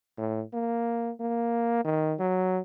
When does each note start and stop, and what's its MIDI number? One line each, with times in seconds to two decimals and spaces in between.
0.18 0.42 45
0.54 1.11 58
1.20 1.84 58
1.84 2.14 51
2.20 2.60 54